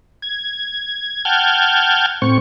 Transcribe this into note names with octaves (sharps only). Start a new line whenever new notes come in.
G#6
F#5 G5 A5 F6 G6 G#6
A2 C4 C#6